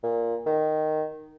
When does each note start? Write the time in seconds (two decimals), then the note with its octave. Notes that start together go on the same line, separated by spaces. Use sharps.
0.03 A#2
0.46 D#3